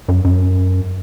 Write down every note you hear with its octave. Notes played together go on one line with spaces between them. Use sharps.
F#2
F#2